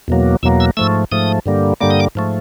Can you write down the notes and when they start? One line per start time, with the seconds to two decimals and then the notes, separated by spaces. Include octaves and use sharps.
0.08 E2 B2 F#3 A#3
0.43 E2 B2 F#3 A#3 E6
0.60 E6
0.77 G#2 F3 A3 E6
1.11 G#2 F3 A3 D#6
1.46 G2 D3 G3 A#3
1.81 G2 D3 G3 A#3 D6
1.90 D#6
2.00 D6
2.15 G#2 F3 A3